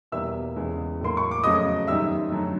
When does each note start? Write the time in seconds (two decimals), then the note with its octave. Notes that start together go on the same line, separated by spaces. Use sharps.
0.12 E2 B2 G3 A#3 E5 E6
0.56 E2 C#3 E3 G#3
1.00 A2 F#3 A#3 C6
1.17 C#6
1.31 D6
1.44 F2 C#3 F#3 A3 D#5 D#6
1.87 F#2 D#3 G3 E5 E6
2.32 F#2 D3 F#3 A3